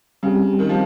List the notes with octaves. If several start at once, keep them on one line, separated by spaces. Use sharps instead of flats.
C#3 G3 C4 G4
D#3
F3